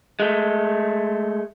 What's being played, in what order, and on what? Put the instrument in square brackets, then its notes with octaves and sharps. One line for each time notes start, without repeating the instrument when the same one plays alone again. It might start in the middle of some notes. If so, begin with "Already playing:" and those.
[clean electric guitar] G#3 A3